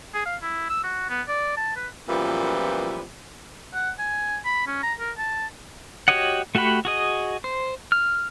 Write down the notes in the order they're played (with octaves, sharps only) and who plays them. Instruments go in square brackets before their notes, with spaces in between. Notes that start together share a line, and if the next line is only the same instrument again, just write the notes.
[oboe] G#4
F5
E4
E6
F#4
B3
D5
A5
B4
[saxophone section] F#2 A#2 E3 F3 G3 B3
[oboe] F#5
G#5
B5
C#4
A#5
A#4
A5
[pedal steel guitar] F#4 G4 C#5 D#5 F#5
A3 F#4 G4 F#5 B5
F#4 G#4 D#5
C5
F6